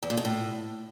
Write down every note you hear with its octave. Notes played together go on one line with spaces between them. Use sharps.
E2
A#2
B2
A2